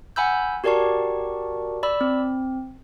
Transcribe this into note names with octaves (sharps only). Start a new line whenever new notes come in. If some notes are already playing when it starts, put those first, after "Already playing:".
F#5 G#5 B5 E6 G6
F#4 G4 A#4 D5 A5 C#6
D5 B5 E6
C4